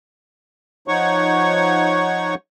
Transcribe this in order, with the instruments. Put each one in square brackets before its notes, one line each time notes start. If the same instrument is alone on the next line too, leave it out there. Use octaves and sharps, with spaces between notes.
[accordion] F3 D#4 C#5 F#5 C#6